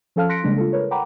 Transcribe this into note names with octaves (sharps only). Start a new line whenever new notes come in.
F3 C#4 A4 F5 A5 F6
C6 F#6 A#6 B6 C#7 D7
C#3 G3 G#3 A#3 D4
F4 A4
A#4 B4 C#5
F#5 G5 A#5 B5 D6